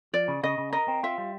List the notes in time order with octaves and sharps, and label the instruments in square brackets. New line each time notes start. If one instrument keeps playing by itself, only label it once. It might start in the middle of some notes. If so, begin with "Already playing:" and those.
[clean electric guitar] F3 [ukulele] D5
[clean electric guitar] C#3
[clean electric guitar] C#3 [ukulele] D#5
[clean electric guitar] C#3
[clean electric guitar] A#4 [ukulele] D#5
[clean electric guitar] C4
[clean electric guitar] F4 [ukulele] E5
[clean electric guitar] G3